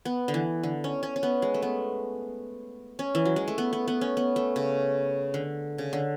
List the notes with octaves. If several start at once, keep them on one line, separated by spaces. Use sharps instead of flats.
B3
D3
E3
D3
C#4
C#4
C#4
B3
G#3
A3
B3
C#4
E3
F#3
G#3
A3
B3
B3
B3
C#4
B3
A3
C#3
D3
C#3
D3